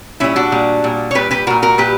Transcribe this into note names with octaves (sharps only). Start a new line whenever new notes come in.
A#2 G3 C#4 E4
D4 F#4
A#2 G3
A#2 G3
C#5
A#2 G3 G4 B4
G4 B4
A#2 G3 F#4 A#4
F#4 A#4
A#2 G3 G4 B4